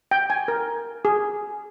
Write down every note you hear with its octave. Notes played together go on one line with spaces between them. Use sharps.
G5
G#5
A#4
G#4